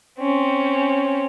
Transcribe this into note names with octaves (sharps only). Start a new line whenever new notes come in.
C4 C#4